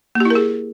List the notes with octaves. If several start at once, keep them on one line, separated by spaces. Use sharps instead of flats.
A#3
G4
E4
A#4
G#4